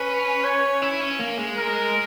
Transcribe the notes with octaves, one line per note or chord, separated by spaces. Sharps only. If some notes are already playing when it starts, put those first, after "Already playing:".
Already playing: C#4 B4
C#5
E4
C#4
A#3
G#3
A#4